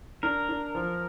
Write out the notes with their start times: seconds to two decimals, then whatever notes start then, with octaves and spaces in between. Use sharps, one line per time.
0.23 D4 A#4
0.49 D4
0.75 F3